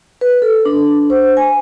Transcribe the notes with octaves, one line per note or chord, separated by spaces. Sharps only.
B4
A4
D4
C5
G#5